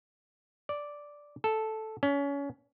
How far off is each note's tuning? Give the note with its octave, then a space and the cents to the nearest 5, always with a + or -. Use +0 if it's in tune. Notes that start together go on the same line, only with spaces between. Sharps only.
D5 -5
A4 -5
C#4 +30